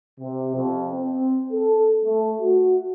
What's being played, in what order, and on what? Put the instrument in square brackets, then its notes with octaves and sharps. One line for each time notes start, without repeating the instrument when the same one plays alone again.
[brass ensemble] C3
F2
C4
A4
A3
F#4